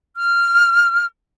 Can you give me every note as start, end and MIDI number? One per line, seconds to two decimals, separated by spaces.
0.16 1.05 89